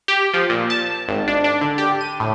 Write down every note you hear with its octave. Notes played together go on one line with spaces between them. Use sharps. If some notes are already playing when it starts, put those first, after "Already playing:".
G4
F3
A#2
A5
G#1
D4
D4
D3
G4
D#7
A2